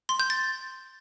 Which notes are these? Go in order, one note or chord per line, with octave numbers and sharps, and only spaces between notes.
C6
G6
A6